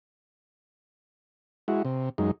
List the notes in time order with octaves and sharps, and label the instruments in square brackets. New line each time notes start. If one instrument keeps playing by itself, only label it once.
[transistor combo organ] G#3 E4 F#4
C3
F#2 G#3 D#4